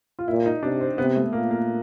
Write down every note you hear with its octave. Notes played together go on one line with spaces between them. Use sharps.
F4
A#2 E4
D#4
C3 D4
C4
C3 B3
A3
A#2 A#3
A#3